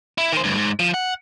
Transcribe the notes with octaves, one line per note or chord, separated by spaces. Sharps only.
E4
D#3 C5
D2 G2
G#2
F3
F#5